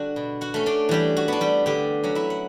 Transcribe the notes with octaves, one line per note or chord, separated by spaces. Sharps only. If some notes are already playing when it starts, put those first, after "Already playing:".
Already playing: D3 G3 D4 F#4
B2
F#4 F#5
A3 C#4
D4 D5
E3 G3 G4
F#4
B3 D4
G3 G4
D3 G3 G4
F#3 C#4
E4 E5
F#5